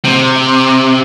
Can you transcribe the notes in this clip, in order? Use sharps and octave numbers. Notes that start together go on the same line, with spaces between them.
C3